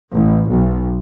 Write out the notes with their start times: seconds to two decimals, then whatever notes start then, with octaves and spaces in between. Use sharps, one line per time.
0.13 A1
0.50 B1